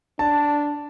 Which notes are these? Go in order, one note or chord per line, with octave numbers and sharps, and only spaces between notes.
D4 A5